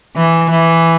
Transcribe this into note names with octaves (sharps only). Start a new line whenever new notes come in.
E3
E3